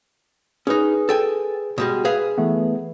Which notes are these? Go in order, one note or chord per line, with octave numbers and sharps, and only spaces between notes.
C#4 D#4 G#4 B4
A4 G5 G#5
B2 G3 G#3
G#4 B4 E5 F5
E3 A3 B3